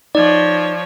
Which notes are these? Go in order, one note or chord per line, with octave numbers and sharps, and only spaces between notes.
F3 D#4 C#5 D5